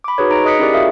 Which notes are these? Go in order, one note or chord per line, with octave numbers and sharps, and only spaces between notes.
B5 D6
D#4 F#4 G#4 B4 C#5
D#4 A#5 D7
G#4 D#5 D#6 F#6 B6 C#7
C#4 E4 G4 G#4 A#4 D5
F4 F#4 G#4 A#4 E5 F5